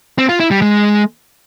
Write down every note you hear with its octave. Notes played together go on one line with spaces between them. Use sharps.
C4
F4
E4
G3
G#3